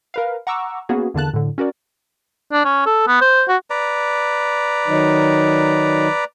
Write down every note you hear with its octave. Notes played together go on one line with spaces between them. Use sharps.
A#4 B4 F5
F#5 A#5 C#6 D6 E6
A#3 B3 C#4 F#4 G#4
E2 D3 A#3 A5 F#6
A2 D3
C#4 F#4 A#4 D5
D4
C#4
A4
B3
C5
F#4
B4 D5 A#5
D#3 F#3 D#4